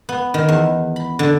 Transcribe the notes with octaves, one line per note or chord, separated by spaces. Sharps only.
B3
D#3
E2
B5
D3